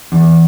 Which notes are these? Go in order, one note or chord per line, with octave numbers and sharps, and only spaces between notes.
E2